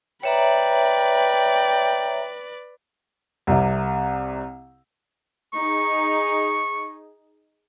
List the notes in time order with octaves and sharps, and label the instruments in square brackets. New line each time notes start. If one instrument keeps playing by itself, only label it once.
[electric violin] B4 D5 [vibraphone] C#5 E5 A#5 [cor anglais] G5
[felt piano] C2 C3
[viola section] D#4 G#4 [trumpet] C#6